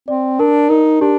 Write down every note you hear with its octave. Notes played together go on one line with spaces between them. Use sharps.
C4 D5
D4 A#4
D#4 A#4
D4 G4